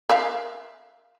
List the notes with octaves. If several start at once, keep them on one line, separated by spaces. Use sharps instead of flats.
A#4 E5 F5